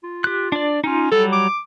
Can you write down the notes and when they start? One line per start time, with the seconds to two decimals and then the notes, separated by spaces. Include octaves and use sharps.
0.04 F4
0.24 G4 F#6
0.52 D4 D5
0.84 C#4 D#4 F4
1.12 F#3 G3 A4
1.32 D6